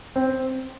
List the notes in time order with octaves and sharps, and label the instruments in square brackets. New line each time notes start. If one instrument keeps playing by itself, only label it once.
[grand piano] C4